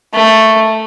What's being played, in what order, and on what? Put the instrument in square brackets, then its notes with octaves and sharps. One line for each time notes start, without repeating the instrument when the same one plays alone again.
[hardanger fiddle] A3